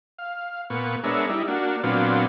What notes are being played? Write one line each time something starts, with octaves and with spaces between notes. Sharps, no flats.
F5
A#2 B3 C#6
G#3 B3 D4 A#4 C#5 E5
G3 D#4 E4
A#3 D4 F#4
A#2 F#3 B3 C4 D4 F4